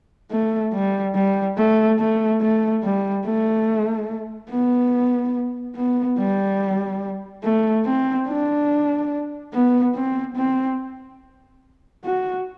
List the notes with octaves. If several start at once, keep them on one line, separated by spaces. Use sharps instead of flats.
A3
G3
G3
A3
A3
A3
G3
A3
B3
B3
G3
A3
C4
D4
B3
C4
C4
F#4